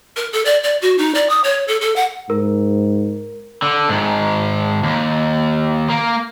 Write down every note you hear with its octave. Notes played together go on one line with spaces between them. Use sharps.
A#4
A4
D5
D5
F#4
D#4
D5
D#6
C#5
A4
A4
F#5
G#2 A#4
D3
G#2 D#3
D#2
A#3